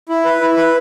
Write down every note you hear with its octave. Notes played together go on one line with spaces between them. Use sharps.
E4
B4
E4
B4